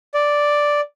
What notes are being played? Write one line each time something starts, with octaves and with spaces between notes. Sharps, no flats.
D5